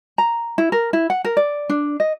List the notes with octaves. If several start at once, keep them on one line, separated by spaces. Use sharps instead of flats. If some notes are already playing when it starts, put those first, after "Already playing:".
A#5
E4
A#4
E4
F#5
A#4
D5
D4
D#5